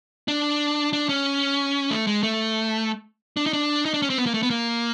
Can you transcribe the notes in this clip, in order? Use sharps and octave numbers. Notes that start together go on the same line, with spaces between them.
D4
D4
C#4
A3
G#3
A3
D4
D#4
D4
D#4
D4
C#4
C4
B3
A#3
A3
B3
A#3